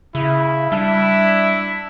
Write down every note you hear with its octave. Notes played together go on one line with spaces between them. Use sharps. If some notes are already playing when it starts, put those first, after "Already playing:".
C#3 E4
G3 D4 E4 E5